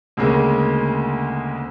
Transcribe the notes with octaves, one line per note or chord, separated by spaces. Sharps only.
D2 C#3 G#3 A#3